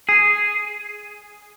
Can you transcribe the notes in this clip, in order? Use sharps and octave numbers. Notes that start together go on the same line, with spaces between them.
G#4